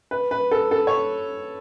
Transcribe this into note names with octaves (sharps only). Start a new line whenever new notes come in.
B4
B4
A4
A4
C#5